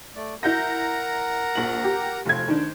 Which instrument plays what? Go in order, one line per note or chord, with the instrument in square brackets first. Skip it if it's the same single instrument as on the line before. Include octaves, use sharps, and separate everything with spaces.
[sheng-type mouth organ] A3 D5
[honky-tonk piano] E4 G6 A#6 [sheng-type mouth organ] A#4 F#5 A#5
[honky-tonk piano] A#1 F#7
G4
[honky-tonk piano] F1 G#6 [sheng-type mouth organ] C4 F4
[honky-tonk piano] D#3 D4 [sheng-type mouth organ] C5